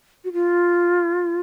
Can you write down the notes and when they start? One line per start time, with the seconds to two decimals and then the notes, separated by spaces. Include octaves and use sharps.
0.24 F#4
0.32 F4